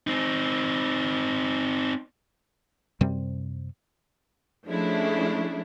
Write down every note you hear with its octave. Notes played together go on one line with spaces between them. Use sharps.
C4 D#4
F#2 C3 G3 C4
F3 G#3 A3 C#4 D4 E4